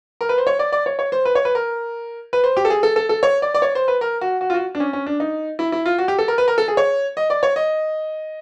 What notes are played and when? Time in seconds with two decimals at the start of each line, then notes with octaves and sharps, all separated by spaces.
0.21 A#4
0.29 B4
0.38 C5
0.47 C#5
0.59 D5
0.72 D5
0.86 C#5
0.99 C#5
1.12 C5
1.25 B4
1.35 C#5
1.45 B4
1.55 A#4
2.33 B4
2.44 C5
2.57 G4
2.65 A4
2.70 G#4
2.83 A4
2.96 A4
3.09 A4
3.23 C#5
3.42 D5
3.54 D5
3.62 C#5
3.75 C5
3.88 B4
4.01 A#4
4.21 F#4
4.41 F#4
4.50 F4
4.54 F#4
4.75 D4
4.80 C#4
4.93 C#4
5.06 D4
5.20 D#4
5.59 E4
5.72 E4
5.86 F4
5.98 F#4
6.08 G4
6.19 A4
6.28 A#4
6.38 B4
6.48 A#4
6.58 A4
6.68 G#4
6.77 C#5
7.17 D#5
7.30 D5
7.43 C#5
7.56 D#5